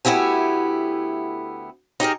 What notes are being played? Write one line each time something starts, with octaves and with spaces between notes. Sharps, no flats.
D2 A3 B3 E4 G4 G#5
D#4 G4 G#4 A#4